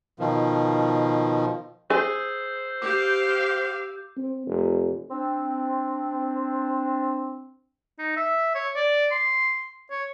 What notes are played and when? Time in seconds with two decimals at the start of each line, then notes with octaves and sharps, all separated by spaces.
0.19 B2 D#3 F3
1.90 G#4 C5 E6
2.82 G4 F5 D6 G6
4.17 C4
4.47 F1
5.11 C4 D4
7.99 D#4
8.16 E5
8.55 C#5
8.76 D5
9.11 C6
9.91 C#5